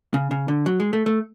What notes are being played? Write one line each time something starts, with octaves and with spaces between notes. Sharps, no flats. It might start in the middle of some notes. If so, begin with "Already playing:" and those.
C#3
C#3
D3
F#3
G#3
A3
A3